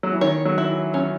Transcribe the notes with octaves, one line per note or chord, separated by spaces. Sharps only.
F#3
E3
D#3 C#5
F#3
E4
E3
F#3 C#4